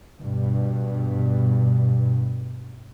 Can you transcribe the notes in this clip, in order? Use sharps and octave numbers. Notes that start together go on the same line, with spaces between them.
G2 B2